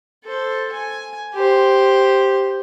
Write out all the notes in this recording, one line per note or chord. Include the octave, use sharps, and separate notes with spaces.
A4 C5
G#5
G4 C5